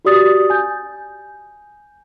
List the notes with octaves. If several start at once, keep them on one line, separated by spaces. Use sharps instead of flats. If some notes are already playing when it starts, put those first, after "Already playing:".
F#4 G4 D5 D#6 A6
G#5 G6